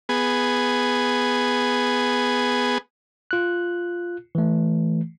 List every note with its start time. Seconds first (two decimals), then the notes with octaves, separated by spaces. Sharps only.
0.09 B3 G#4
3.31 F4 F#6
4.35 E3 A3